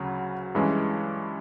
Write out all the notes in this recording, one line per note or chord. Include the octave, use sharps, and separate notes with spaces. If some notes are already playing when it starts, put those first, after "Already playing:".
Already playing: D2 C#3 F#3
G2 E3 G#3 C#4